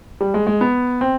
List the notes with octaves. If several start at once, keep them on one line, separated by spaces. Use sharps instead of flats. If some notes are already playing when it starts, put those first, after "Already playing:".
G3
G#3
G#3
B3
C4